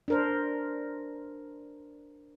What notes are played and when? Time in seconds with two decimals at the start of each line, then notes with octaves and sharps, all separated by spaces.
0.08 D4 A#4 C5